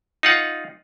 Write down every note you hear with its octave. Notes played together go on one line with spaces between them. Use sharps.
D#4 F4 F#5